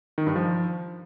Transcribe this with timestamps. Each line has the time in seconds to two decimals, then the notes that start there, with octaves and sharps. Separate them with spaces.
0.18 D#3
0.27 G2
0.36 F3